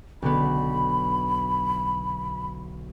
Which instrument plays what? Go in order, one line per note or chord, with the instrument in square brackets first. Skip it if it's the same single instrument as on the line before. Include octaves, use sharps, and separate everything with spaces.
[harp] B1 D3 B3 [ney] B5